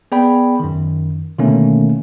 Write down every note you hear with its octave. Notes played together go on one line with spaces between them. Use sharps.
B3 G#4 D5 G5 B5
F#2 D#3
B2 D3 D#3 A3 A#3 C#4